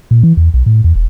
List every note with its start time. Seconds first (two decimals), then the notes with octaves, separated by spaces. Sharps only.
0.11 A#2
0.23 E3
0.37 E2
0.54 B1
0.66 A2
0.84 E2
0.95 E1